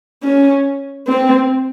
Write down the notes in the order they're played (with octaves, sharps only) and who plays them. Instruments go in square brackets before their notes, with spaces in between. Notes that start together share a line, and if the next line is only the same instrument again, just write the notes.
[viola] C#4
C4